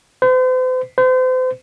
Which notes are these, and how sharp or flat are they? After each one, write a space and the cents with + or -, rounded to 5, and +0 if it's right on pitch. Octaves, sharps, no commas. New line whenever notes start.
C5 -45
C5 -40